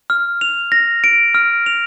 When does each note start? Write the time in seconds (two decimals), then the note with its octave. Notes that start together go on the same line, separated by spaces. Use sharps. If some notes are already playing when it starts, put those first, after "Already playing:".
0.10 F6
0.41 F7
0.72 A#6
1.04 D7
1.34 F6
1.66 F7